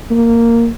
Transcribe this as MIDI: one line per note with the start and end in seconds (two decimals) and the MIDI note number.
0.11 0.69 58